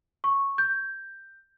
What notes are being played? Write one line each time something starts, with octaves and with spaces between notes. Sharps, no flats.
C#6
G6